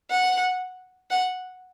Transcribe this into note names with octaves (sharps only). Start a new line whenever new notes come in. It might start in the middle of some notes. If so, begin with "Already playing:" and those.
F#5
F#5